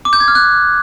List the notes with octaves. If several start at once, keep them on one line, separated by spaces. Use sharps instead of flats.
D6
G6
G#6
F6
F#6